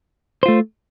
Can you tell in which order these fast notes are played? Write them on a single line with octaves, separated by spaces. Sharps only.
C5 F4 A3